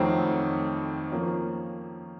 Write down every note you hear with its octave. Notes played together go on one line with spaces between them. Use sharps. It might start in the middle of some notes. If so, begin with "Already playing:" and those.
Already playing: F2 D#3 F#3 A3 C4
F3 A#3 C#4